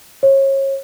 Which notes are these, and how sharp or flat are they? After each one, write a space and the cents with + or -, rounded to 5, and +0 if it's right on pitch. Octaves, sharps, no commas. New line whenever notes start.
C#5 -30